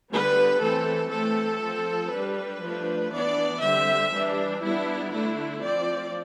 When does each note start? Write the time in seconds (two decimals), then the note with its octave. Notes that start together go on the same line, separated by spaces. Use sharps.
0.12 D3 G3 B3 B4
0.61 E3 A3 C4 A4
1.11 E3 A3 C4 A4
1.62 F3 C4
2.12 G3 D4 B4
2.63 F3 A3 D4
3.13 E3 B3 D4 D5
3.62 D3 G3 C4 E5
4.13 E3 G3 D4
4.63 G3 B3 D4 E4
5.13 D3 A3 D4 E4
5.64 F3 C4 D5